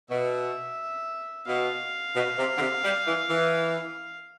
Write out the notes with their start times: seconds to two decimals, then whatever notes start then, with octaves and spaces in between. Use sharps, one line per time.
0.10 B2 E5
1.47 B2 F5
2.15 B2
2.38 C3
2.57 D3
2.61 C3
2.84 G3
3.07 E3
3.30 E3